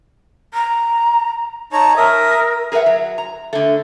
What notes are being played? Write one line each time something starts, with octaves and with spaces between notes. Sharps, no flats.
A#5
D#4 C#5 A5 A#5
A#4 E5 D#6
G#4 A#4 B4 E5 F#5
F#3
A#5
D3 A3